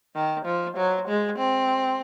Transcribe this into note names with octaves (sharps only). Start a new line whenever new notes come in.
D#3
F3
F#3
G#3
C4